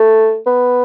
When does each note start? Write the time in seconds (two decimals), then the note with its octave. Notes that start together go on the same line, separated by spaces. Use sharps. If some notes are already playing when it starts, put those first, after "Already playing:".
Already playing: A3
0.47 B3